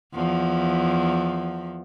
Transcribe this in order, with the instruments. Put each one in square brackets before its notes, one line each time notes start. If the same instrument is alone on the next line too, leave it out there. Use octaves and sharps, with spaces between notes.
[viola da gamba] E2 F3